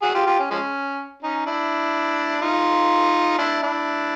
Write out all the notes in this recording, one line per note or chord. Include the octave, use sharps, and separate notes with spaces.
F#4 G#4
F4 G4
F4 G4
C#4
F3 G#3 C#4
C#4 D#4
D4 E4
D#4 F4
D4 E4
D4 E4